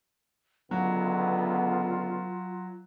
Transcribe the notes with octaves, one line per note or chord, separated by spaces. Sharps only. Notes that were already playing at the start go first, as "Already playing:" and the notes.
C#2 D3 F#3 B3 F4